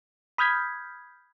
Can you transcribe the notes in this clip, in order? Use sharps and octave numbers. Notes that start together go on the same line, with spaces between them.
B5 D#6 F6 G6 G#6 B6